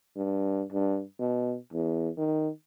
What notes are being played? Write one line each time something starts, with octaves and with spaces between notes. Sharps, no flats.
G2
G2
B2
E2
D#3